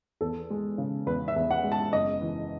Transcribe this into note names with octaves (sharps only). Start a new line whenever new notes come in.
E2 A4
G#3
C#3
E2 B4
E5
E2
F#5
G#3
A5
F#1 D#5
E3